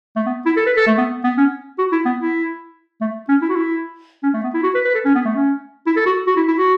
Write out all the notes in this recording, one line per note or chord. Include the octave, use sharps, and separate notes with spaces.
A3
B3
E4
A4
B4
A4
A3
B3
B3
C#4
F#4
E4
B3
E4
A3
C#4
E4
F#4
E4
C#4
A3
B3
E4
F#4
B4
B4
A4
C#4
B3
A3
C#4
E4
A4
F#4
F#4
E4
E4
F#4